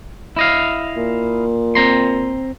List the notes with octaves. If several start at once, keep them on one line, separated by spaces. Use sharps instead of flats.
E4 D#5 F5
A#2
C4 A#5 C6